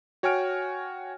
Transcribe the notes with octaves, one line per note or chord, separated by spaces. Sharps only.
F#4 C#5 G5 G#5 F6 D7